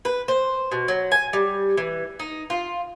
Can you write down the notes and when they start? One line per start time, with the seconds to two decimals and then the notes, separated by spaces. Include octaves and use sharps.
0.05 B4
0.28 C5
0.72 B2
0.88 F#3
1.12 G#5
1.33 G3
1.77 E3
2.20 D#4
2.50 F4